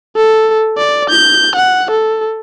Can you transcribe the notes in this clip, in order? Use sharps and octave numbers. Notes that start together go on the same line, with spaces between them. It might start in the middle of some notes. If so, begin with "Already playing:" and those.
A4
D5
G6
F#5
A4